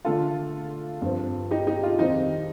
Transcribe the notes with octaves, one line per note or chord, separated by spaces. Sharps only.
D3 A3 D4 F4 A4
G2 F3 C4
D#4 G4
D#4 G4
F4
F2 D#3 G3 C4 D#4